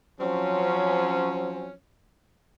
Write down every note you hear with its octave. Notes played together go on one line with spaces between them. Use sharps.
F3 F#3 C4 C#4